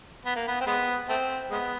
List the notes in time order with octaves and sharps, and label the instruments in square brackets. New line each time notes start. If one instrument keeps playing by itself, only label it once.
[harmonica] B3
A#3
B3
C4
G#3 B3
A3 C4
G#3 B3